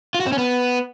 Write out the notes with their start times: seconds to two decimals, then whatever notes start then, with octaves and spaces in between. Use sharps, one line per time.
0.15 F4
0.20 F#4
0.26 C4
0.32 C#4
0.38 B3